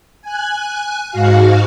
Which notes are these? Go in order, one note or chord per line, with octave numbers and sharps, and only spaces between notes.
G#5 F#6
G#2 F#4 F5